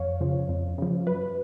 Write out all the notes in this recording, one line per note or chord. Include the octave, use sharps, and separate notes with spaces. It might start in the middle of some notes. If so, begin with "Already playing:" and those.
Already playing: F2 C#5 F5
C#3 F3
F2
C#3 F3
F#2 B4